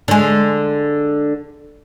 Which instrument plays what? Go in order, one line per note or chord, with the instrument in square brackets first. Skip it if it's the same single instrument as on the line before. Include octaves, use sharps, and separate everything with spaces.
[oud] D3 G#3